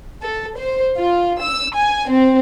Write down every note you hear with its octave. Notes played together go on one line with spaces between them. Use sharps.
A4
C5
F4
E6
G#5
C4